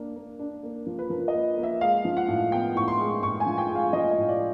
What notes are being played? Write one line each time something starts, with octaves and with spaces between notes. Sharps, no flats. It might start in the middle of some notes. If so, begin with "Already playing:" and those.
Already playing: A#3 D4
A#3
D4
A#3
F3
B4
F3 A#4
D#5
A#3
A#3
E5
G#3 F5
F3
F#5
A2
B3 G5
A2 C#6
C6
G#3
A2 C#6
G#5
F3
G5
G#3
F5
F3 D#5
D#5
A2
D5